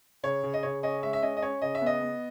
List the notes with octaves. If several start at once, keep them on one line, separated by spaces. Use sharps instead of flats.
C#3 C#5
C#3
D#5
C#3 C#5
C#4 D#5
G#3 E5
E5
C#4 D#5
D#5
C#4 C#5
C#3 D#5
E5
B3
D#5
B3